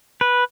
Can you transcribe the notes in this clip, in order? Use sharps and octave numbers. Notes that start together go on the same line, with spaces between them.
B4